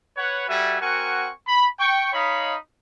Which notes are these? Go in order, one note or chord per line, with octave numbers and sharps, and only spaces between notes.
B4 C#5 F#5
G3 F#4 A4 E5 G#5
C4 F#4 A#4 F#5 G#5 C#6
B5
G5 C#6
D#4 C#5 D#5 F5 B5